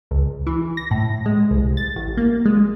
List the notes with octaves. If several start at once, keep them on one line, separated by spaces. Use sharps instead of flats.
C#2
E3
A#6
A2
G#3
C2
A6
A1
A#3
G#3